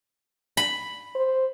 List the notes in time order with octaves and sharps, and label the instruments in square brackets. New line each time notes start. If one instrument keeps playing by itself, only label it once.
[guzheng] B5
[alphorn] C5